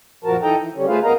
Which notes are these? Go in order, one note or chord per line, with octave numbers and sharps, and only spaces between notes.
F#2 A#2 F3 F#4 A#4 A5
E3 D#4 A4 D#5 G5 A#5
E3
D3 G3 C#4
A3 F4 G#4 B4 C5 F5
D2 B3 A#4 D#5 F5 A#5